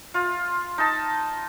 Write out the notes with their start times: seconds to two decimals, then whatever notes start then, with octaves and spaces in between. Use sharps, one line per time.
0.14 F4
0.78 D#4 A5